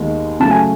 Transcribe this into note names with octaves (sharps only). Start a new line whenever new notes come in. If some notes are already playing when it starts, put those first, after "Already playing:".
Already playing: D#2 D#3 G#3 B3
C#3 F#3 A3 A5
G#5